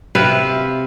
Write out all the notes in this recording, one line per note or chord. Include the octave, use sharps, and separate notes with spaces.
C3 B4 E5 F5